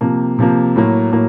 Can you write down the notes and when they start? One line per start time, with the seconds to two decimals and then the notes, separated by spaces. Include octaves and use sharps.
0.01 C3 F3 A#3
0.39 C3 F3 A#3
0.76 A2 F#3 A#3
1.12 A2 F#3 A#3